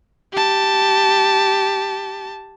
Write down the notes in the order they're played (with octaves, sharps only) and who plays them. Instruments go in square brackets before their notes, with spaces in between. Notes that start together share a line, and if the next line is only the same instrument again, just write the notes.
[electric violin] G4 A5